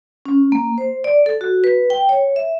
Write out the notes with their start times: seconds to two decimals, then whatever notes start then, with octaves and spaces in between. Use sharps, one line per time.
0.26 C#4
0.52 A#3
0.78 C5
1.04 D5
1.26 A4
1.41 F#4
1.64 B4
1.90 G5
2.09 C#5
2.36 E5